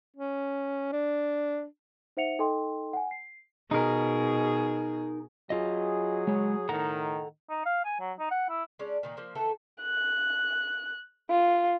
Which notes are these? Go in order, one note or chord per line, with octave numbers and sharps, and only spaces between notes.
C#4
D4
D#4 C5 E5 F#5 C#7 F7
D#4 A4 D#5 G5 C6
F#5 G#5
C7
B2 D#4 G#4 A#4
F#3 F4 G#4 D#5
G#3 C#5
A2 D#3 A4 F#5 A#5
D#4
F5
G#5
F#3
D#4
F#5
E4
G#3 C#4 D4 D5
A#2 D#3 A#3
F3 A#3 C5
D#3 E3 A3 A4
F#6
F4